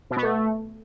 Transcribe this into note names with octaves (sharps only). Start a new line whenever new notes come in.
B2
B3
A3